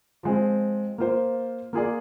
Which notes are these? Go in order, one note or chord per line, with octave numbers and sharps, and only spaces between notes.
F3 G#3 C4
A#3 F4 C5
A#3 F4 G#4 D5